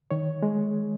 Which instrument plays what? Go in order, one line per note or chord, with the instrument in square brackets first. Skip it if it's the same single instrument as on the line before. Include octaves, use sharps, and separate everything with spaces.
[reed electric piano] D#3 C#5
G#3